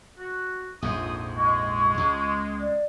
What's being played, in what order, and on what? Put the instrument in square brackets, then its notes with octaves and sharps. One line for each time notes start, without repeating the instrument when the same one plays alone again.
[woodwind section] F#4
[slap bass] A#1 F2 G#2 [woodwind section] D#6
[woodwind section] G#3 [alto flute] C#6
[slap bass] C#2
[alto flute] D5